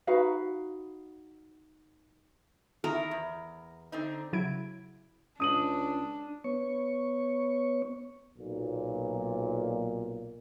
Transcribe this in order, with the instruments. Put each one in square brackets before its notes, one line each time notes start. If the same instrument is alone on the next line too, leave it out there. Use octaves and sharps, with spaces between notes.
[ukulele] D#4 F#4 B4 F5
[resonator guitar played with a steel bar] D#3 E4 [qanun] A#4
[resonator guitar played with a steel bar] E2
D3 C4 D#4
[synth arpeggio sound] C#3 F#3 E4 B5 G#6 D7
[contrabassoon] C#2 [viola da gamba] D4 [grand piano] D#6 D#7 F#7
[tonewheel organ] B3 C#5 C#6
[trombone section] B1 A#2